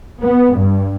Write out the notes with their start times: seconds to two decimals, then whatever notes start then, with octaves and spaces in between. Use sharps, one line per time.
0.22 B3
0.55 G2